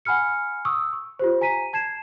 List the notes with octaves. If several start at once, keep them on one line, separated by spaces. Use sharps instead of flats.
F#5 G#5 B5 F6 C#7
C#6 D#6 E6
C#6
F4 G4 C5
G#5 A#5 B6 D#7
A5 G#6 C7 E7